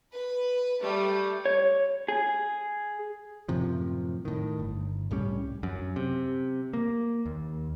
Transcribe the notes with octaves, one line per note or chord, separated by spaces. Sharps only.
B4
G3 A3
C#5
G#4
F#2 A2 C3 F3
A2 D#3
G1
C2 A2 G3 C#4
F#2
C3
A#3
D#2